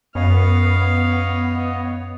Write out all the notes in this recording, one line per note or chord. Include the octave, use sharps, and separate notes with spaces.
F#2 B3 C#5 D#5 F5